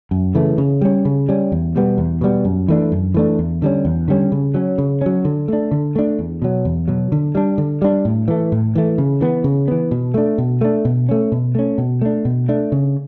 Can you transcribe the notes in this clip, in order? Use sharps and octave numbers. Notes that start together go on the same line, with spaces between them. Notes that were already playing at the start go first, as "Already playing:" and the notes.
F#2
C#3 E3 A3
C#3
G3 C#4
C#3
G3 C#4
E2
B2 G3 B3
E2
B2 G3 B3
F#2
E3 A3 D4
F#2
E3 A3 D4
E2
D3 G3 C#4
E2
D3 G3 C#4
C#3
F#3 C#4
C#3
F#3 C#4
D3
A3 D4
D3
A3 D4
E2
B2 F#3
E2
B2 F#3
D3
G3 D4
D3
G3 D4
A2
E3 A3
A2
E3 A3
C#3
E3 B3
C#3
E3 B3
B2
A3 D4
B2
A3 D4
B2
A3 C#4
B2
A3 C#4
B2
A3 D4
B2
A3 D4
C#3